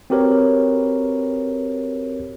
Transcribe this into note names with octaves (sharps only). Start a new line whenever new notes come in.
C4 F#4 G4 A#4 B4 C#5